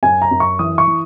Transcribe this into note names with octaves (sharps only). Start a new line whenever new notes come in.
F#2 G#5
A#5
F#2
C#6
E3 D#6
C#6
E3